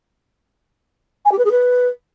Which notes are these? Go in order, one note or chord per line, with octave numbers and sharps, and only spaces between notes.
G#5
G4
B4
G#4
B4